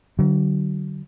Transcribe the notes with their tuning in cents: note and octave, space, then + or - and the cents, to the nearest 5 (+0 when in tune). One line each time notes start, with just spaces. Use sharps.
D3 +15 F#3 +40